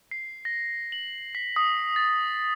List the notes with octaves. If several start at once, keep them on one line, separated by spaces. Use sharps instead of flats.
C7
A#6
F#7
B6
D#6
A6